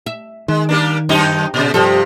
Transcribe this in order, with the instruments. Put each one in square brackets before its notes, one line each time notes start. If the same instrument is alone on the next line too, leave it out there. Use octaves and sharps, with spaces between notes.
[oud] E5
[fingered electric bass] D#3 [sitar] G#3
[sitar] G3 A#3 D4
[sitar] F#2 D#4 G4 [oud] C4
[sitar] A#2 C#3
[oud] G2 G4 A4 [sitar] C3 F3